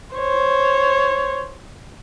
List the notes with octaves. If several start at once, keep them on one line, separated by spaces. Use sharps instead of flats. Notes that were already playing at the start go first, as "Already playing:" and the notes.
C5 C#5